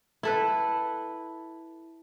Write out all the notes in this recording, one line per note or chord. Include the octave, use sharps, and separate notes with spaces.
E4 A4 B4